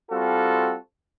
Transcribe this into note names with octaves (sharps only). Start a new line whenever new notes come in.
G3 C4 F4 F#4 A4